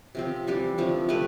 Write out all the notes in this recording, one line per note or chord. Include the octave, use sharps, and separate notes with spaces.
C3 F3 C4
E3 G3 D4 G4
C3 F3 A3
A3 C4 G4 B4